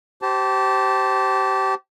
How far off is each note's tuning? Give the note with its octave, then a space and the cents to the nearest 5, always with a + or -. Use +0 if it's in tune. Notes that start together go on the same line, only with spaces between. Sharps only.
G4 -25 C5 +0 A5 +0